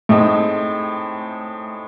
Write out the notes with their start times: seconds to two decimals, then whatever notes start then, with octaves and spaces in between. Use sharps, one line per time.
0.09 A2 G#3 A3 C4 D#4